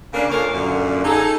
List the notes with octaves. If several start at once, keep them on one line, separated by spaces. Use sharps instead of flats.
C#3 A#3 D4
A#2 F3 A4 A#4 C#5 F5
F#2 A#2 D3
D#4 G#4 A4